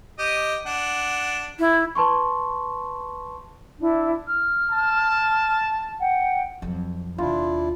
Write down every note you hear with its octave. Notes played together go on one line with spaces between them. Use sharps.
G4 D#5
D4 F#5
E4
B4 A5 C6 C#6
D4 E4
F6
A5
F#5 G5
F2 F#3
D#2 B2 D4 E4 F4